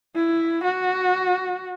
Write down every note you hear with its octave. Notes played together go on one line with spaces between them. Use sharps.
E4
F#4